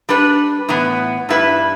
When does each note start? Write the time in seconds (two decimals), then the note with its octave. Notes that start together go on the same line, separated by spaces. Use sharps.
0.09 G3 D4 B4
0.69 A2 E3 B3
1.29 G2 G3 E4 B4